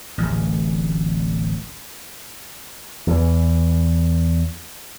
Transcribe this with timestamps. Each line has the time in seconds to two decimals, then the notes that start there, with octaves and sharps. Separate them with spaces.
0.18 D1 A1
3.07 E2 E3